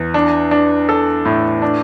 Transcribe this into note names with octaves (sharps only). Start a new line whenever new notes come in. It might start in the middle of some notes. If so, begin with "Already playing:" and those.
Already playing: E2
D4
D4
A4
A2
D4